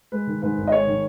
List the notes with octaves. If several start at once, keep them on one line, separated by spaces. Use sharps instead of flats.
G#3 B4
D#3
G#2 B4
G#1
D#5
G#3 C#5
D#3